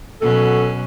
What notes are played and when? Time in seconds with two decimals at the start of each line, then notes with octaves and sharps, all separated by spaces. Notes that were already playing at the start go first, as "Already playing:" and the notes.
0.21 B2 F#3 C#4 A4